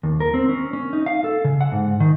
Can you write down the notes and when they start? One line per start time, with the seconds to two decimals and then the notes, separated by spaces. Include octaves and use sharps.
0.03 D#2
0.20 A#4
0.34 C4
0.49 C#4
0.73 C#4
0.93 D#4
1.06 F5
1.24 A4
1.44 C#3
1.61 F#5
1.72 G#2
2.00 D#3